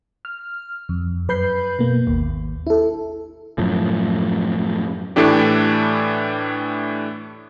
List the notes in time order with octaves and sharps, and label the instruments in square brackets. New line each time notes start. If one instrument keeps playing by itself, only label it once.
[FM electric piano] F6
F2
F#2 B4 B5 G6 C7
B2 A#3
G#1 D#2
E4 A4
[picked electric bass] F#2 A2 F3
[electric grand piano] A2 E3 A3 D4 G4